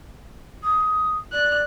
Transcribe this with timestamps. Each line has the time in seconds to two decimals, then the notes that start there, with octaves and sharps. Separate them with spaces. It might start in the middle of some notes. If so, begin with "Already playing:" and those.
0.63 D#6
1.33 D5 F#6